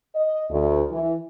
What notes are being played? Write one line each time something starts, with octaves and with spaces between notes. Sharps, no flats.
D#5
D2
E3